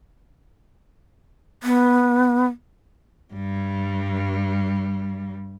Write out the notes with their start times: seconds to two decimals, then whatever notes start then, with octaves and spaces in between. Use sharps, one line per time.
1.63 B3
3.34 G2 G3